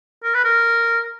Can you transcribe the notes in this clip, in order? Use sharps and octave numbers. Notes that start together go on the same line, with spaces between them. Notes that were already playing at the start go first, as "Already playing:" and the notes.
A#4
B4
A#4